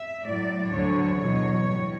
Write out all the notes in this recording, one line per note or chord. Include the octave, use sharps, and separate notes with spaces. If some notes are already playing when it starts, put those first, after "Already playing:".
Already playing: E5
A2 F#3 D5
D2 D3 F#3 C#5
E2 B2 F#3
A2 G3